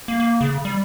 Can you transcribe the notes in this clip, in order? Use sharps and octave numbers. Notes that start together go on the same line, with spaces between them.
A#3
A#3
C#3
G3